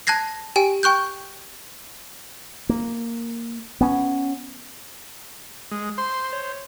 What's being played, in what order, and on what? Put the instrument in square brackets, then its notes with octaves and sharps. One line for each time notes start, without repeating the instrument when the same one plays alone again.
[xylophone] A5 F#6 G#6 A#6 C7
G4 G5 G#5
G5 C#6 F#6 G6
[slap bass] A#3
B3 C#4
[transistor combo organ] G#3
[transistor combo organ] C5 [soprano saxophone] C6
[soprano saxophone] C#5